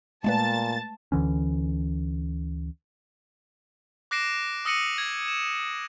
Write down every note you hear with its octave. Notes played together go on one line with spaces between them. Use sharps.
A#2 G#3 A3 B4 A5 A6
D2 D3 E3 C#4
D6 F#6 A#6 C7 D7 E7
D#6 E6 A#6 C#7 D#7 F#7
G#6
E7